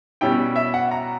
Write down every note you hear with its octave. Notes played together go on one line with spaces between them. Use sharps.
B2 G3 C#4 E4 G5
E5
F#5
A#5